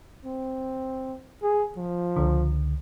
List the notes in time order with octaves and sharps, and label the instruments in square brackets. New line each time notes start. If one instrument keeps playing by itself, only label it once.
[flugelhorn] C4
G#4
F3
[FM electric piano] C#2 D3